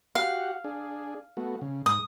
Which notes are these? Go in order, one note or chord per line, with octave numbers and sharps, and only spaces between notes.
F#4 G4 F5 F#5
D4 G#4
A3 B3 F#4
C#3
G#2 D#6